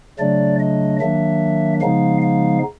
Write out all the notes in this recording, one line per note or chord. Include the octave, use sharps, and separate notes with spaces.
C#3 F#3 A3 D4 D5
D#5
D#3 F#3 A#3 D4 E5
C#3 F3 G#3 B3 D#4 F5
F5